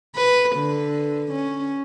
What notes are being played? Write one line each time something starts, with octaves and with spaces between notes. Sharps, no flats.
B4
D3
C#4